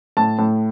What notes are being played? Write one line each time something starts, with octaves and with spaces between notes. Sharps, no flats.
A2 A5
A2